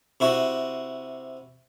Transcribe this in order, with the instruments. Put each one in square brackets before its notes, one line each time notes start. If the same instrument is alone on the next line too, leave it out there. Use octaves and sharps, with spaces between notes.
[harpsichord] C3 E4 F#4